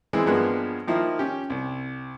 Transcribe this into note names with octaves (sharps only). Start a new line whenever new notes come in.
E3 G#3 C4
G2 F3 G#3 A#3 B3 F#6
D#3 F3 A#3 E4
C#4 G4
C2